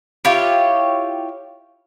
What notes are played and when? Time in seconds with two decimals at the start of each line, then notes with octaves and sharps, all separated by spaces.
0.25 E4 F4 G4 C#5